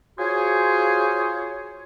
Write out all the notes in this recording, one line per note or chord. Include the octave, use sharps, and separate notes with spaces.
F4 F#4 G#4 C5 C#5